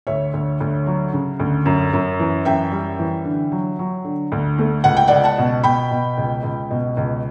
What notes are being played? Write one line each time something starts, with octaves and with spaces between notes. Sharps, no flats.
D2 C#5 E5
D2
D2
F#3
C#3
D2
F#2
F#2
E3
F#2 E5 G5
G3
E3
D3
F#3
F#3
D3
D2
A3
C#2 F#5
G5
C#2 D5 F#5
F#5 A5
B2
B2 G5 B5
B2
C#2
C#2
B2
C#2